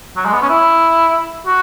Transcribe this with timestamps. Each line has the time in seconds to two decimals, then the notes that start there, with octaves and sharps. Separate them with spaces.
0.16 F#3
0.26 G#3
0.33 B3
0.42 C#4
0.49 E4
1.47 F#4